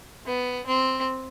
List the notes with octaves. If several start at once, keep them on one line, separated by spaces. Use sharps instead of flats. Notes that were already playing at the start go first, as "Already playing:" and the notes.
B3
C4